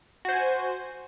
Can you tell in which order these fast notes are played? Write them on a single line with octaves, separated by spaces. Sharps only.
F#4 C5 G#5